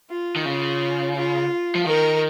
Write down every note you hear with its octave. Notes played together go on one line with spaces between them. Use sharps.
F4
D#3
C#3 F4
F4
F3
D#3 A#4